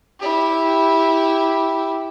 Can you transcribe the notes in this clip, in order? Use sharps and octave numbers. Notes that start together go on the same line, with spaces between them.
E4 G4